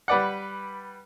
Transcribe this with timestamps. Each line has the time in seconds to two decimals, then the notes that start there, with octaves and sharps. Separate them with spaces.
0.08 G3 B4 D5 F#5